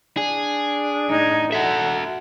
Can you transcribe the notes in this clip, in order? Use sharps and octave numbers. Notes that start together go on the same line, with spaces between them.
D4 G#4
A2 D#4 G#6
F#4 A4 E5 F#5